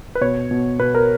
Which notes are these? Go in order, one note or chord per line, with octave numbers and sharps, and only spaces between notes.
B4
B2 C#5
B2
B2 B4
A#4